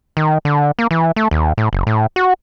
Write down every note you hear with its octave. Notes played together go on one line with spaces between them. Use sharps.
D#3
D3
A#3
E3
A3
D#2
A2
F#1
A2
F#4